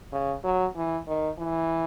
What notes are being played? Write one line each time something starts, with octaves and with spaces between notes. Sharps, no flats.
C#3
F#3
E3
D#3
E3